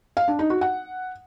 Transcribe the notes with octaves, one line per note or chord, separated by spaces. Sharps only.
F5
D4
D#4
F#4
F#5